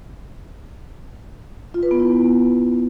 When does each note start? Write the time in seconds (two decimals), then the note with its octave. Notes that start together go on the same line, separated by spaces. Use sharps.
1.74 F4
1.83 B4
1.91 B3
1.99 E4